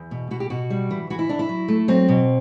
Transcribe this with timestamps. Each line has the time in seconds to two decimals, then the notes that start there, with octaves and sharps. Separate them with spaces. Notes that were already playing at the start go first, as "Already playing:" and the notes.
Already playing: E2
0.11 B2
0.31 B2 F#4
0.40 G4
0.50 B2 F#4
0.70 G3
0.91 E3
1.10 E3 F#4
1.19 E4
1.29 E3 D4
1.39 E4
1.49 F#3
1.68 A3
1.88 F#3 C4
2.09 B2